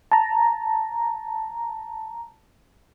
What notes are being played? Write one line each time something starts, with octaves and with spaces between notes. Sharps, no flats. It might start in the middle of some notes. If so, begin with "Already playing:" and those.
A5 A#5